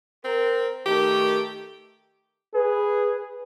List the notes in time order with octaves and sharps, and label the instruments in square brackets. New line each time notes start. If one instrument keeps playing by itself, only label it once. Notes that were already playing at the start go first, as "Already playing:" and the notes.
[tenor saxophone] C4 [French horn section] A#4
[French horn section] D#3 A3 [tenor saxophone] G4
[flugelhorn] G#4 [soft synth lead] B4